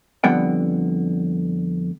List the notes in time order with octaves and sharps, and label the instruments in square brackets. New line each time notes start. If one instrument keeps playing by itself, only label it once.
[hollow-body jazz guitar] F2 D3 G3 B3 F#5 G5